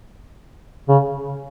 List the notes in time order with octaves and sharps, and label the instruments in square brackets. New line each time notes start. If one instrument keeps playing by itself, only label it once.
[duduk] C#3